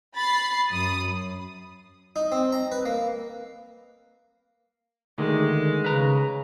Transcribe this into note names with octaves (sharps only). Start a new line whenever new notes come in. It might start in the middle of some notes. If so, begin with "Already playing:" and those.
B5 A6 C7
F#2 D#6
D#4
C4
A#5
B4
A#3
D2 D3 D#3 G#3
C#3 B4 A#5